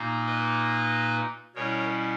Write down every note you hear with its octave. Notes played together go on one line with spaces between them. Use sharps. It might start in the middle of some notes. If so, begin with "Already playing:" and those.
Already playing: A#2 A#3 D#4
B4 D#5
B2 G3 C#4 E4 A#4 C#5